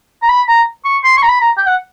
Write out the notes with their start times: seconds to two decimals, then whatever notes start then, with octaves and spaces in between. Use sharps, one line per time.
0.23 A#5
0.29 B5
0.48 A#5
0.85 C#6
1.04 C6
1.17 C#6
1.23 A#5
1.29 B5
1.41 A#5
1.58 G5
1.67 F#5